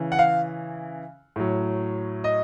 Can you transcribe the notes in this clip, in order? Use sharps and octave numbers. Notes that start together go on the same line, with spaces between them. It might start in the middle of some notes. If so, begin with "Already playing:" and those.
Already playing: C#3 E3
F#5
F5
A2 F#3
D#5